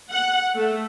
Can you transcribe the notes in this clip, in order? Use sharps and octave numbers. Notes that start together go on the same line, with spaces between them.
F#5
A3